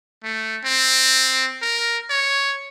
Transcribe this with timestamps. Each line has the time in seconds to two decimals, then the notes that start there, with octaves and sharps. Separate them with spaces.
0.24 A3
0.65 C4
1.62 A#4
2.10 C#5